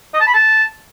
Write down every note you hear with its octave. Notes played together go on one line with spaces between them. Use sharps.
D#5
A5
B5
A5